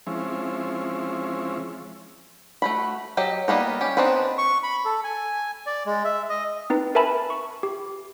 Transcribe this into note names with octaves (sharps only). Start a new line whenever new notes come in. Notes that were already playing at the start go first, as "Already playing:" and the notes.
F3 G#3 C4 C#4 E4
A3 F#4 B5
F#3 G4 D#5
G3 A#3 B3 D#4
C#4 G4
B3 C4 D4 D#4
C#6
B5
A4
G#5
D5
G#3
E5
D#5
C4 D#4 B4
A#4 B4 E5 G#5 A5 B5
C#6
G4